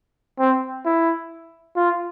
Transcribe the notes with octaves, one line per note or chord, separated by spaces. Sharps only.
C4
E4
F4